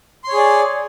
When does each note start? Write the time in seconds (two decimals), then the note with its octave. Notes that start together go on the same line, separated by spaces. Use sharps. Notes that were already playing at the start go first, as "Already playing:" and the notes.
0.24 C6
0.29 C#5
0.33 G#4
0.37 D5